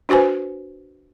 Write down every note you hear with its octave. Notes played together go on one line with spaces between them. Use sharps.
D4 F#4 B4 C5 G#5